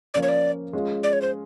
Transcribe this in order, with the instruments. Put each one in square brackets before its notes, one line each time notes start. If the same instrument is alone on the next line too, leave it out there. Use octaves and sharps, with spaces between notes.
[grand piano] F3 A#3 C#4 F4 [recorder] D5
[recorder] C#5
D5
[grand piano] G#3 C#4 F4 G#4
[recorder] D5
C#5
C5